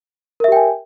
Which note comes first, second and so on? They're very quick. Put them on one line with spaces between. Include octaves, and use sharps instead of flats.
A#4 E5 G4 G5 G#5